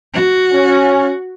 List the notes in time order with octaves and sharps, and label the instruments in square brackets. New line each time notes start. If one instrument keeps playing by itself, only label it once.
[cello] F#4
[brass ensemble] C#4